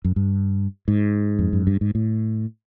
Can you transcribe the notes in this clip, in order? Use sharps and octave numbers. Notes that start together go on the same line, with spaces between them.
F#2
G2
G#2
F2
F#2
G2
G#2
A2